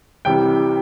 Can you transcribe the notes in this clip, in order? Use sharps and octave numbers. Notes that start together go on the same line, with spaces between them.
C2 C3 E3 G3 G5